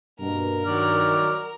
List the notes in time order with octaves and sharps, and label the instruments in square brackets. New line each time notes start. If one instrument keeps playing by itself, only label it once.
[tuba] G2 [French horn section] B2 A#3 [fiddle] A#4
[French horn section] D#3 [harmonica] F#3 D5 F6